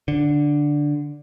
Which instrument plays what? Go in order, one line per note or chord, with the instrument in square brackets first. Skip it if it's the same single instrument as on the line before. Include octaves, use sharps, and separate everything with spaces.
[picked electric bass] D3